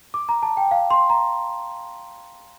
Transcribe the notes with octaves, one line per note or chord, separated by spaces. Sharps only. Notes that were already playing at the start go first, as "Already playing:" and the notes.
D6
A#5
A5
G5
F5
C6
A#5